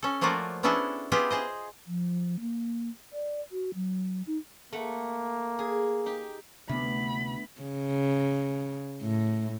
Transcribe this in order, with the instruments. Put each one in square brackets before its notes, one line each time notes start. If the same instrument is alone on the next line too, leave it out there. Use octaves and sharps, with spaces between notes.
[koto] C#4 A4
F3 A3 A#3 F4 F#4 D5
B3 C#4 D4 E4 G#4 A4
B3 E4 F4 G4 G#4
G#4 C5 D#5
[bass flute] F3
A#3
D5
F#4
F#3
D#4
[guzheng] A3 F#5 [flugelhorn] A#3
[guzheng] G#4
D#4 G4
[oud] D2 [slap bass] C3 D4 [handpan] B3 E5 [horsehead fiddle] B5
[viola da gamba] C#3
A2